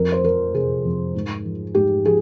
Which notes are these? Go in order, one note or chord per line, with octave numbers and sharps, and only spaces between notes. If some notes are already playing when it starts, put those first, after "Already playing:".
Already playing: F2 A#4
C5
F3 A#4
C3 G#4
F2
G#2
F3
G#2 G4
F3 G#4